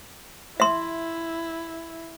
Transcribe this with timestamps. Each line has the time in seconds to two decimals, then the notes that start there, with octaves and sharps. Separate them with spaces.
0.60 E4 E5 C6